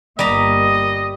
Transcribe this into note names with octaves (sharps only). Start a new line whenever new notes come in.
G1 G3 A#3 D#5 A#5